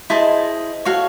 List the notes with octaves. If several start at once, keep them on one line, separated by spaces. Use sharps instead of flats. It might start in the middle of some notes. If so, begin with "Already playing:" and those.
E4 G#4 C5 D#5 A5
F#4 A4 C#5 F5